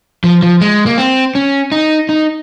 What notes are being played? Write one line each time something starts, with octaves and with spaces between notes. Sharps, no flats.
F3
F3
G#3
A#3
C4
C#4
D#4
D#4